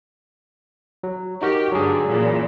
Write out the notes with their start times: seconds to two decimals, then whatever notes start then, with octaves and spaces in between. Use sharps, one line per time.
1.03 F#3
1.42 D#4 F#4 G4 A#4
1.72 G2 D3 F#3 G#4
2.08 A#2 C#3 E3